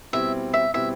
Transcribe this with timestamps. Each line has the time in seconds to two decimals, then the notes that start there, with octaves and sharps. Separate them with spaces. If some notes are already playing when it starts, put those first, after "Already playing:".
0.13 B2 G3 C4 E4 E5
0.54 E5
0.73 B2 G3 C4 E4 E5